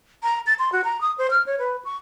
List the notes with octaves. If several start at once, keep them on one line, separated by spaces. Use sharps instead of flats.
A#5
A6
C6
F#4
A#5
D#6
C5
F6
C#5
B4
C#6